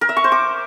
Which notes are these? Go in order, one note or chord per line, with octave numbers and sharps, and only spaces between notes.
A#4
E5
C#6
C5
D6